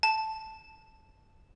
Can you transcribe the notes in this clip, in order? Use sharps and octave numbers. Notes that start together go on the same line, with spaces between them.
A5